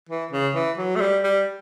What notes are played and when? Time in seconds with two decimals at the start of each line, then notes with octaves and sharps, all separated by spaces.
0.09 E3
0.32 C#3
0.55 E3
0.78 F#3
0.96 A3
1.01 G3
1.24 G3